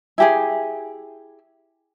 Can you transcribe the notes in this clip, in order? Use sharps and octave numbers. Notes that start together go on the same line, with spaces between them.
E4 G4 G#4